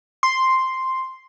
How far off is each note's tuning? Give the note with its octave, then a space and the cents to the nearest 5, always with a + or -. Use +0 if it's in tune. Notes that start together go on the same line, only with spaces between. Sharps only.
C6 +0